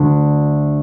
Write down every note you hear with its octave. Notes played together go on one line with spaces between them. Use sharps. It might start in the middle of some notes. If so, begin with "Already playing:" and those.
Already playing: D2 D3